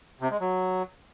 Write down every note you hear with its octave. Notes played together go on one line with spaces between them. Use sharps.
C3
G#3
F#3